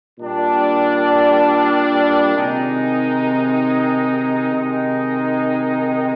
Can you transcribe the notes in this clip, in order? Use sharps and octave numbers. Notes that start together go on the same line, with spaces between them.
A#2 G3 D4
C3 D#3 G#3 D#4
C3 D#3 G#3 D#4